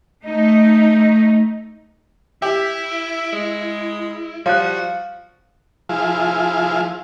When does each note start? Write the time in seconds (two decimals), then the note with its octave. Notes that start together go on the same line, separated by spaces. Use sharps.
0.24 A3 D#4
2.42 E4 G4 E5
3.32 G#3
4.46 F3 G3 F#4 F5 F#6
5.89 F3 E4 G#4 F5